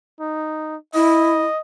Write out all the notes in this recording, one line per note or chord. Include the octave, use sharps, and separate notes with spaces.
D#4
E4 D#5